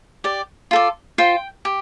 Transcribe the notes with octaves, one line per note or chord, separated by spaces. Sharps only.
G4 D5
F4 A4 D5
F4 C5 G5
G4